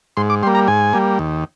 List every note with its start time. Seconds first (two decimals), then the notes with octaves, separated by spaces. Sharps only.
0.17 G#2 C6
0.30 D6
0.43 G3 C6
0.47 A#3
0.55 A#5
0.68 G#2 G#5
0.93 G3 A#3
1.19 D#2